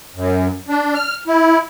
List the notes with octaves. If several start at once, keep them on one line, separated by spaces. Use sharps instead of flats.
F#2
D4
F6
E4